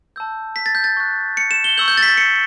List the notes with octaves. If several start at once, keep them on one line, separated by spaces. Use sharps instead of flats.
A5 E6 G6
B6
A6
G6
A6
C#6 F#6
C#7
E7
G7
C#6 E6 G6 F#7
G6
A6
B6
A6
C#7